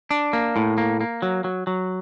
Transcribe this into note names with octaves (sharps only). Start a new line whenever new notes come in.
D4
A#3
A2
A#3
A#3
F#3
F#3
F#3